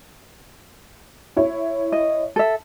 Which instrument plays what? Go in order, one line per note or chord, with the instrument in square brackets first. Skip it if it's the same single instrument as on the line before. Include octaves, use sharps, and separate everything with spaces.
[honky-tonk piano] E4 C#5
[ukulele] D#5
A4 E5